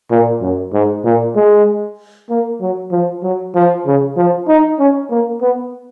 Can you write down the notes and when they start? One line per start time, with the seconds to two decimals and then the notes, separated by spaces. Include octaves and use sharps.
0.11 A#2
0.41 F#2
0.73 G#2
1.04 A#2
1.35 G#3
2.29 A#3
2.61 F#3
2.92 F3
3.23 F#3
3.55 F3
3.86 C#3
4.17 F3
4.48 D#4
4.79 C#4
5.11 A#3
5.42 B3